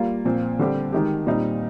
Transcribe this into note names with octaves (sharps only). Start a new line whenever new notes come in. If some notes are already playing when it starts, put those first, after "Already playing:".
Already playing: G3 A#3 F4
A#2 F3 C4
D3 G3 C4 G4
D#3 G#3 D#4 G4
A#2 G3 C4 D#4